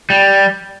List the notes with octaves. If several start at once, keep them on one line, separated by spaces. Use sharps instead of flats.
G3